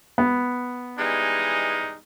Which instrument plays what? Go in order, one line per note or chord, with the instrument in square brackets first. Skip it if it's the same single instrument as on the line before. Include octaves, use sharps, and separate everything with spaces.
[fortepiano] B3
[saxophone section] E3 G3 G#3 [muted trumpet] D#4